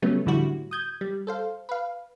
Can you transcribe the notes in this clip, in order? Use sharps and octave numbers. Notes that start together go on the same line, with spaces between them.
C#3 F#3 G3 A3 B3 C#4
A2 D3 F3 G3 E4 F#4
D#6 G6 G#6
G3
A4 C5 F5
B4 F5